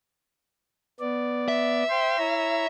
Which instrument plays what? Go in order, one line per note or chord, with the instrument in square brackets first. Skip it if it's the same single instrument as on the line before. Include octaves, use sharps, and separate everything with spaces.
[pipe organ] B3 D5
[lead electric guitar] E5
[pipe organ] C5 G5 C6
E4 C#5 A#5